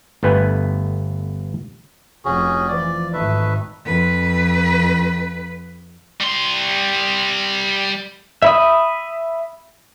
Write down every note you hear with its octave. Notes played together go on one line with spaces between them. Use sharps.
G1 A3 B3 B4 G#5
F1 C#4 F#4 G#4
E3 F3 D5
G#1 A3 D#4 B4 E5
F2 B4
G3 C6
E5 B5 D#6